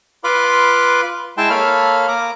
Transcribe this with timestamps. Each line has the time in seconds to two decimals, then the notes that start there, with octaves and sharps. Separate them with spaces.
0.24 F4 B4 F5 B5 C6 D6
1.37 G#3 E4 E5 G5 A5 C6
1.50 A#3 A4 C#5 F5 B5 F6
2.08 A#3 A#5 D6